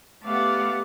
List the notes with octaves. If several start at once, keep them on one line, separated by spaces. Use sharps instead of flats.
A3 B3 G4 D5 F5 F#5